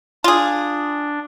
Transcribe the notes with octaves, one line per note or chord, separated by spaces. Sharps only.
D4 F4 G#4